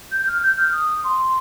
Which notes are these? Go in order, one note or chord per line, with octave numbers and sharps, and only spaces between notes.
G6
F6
G6
F6
D#6
C6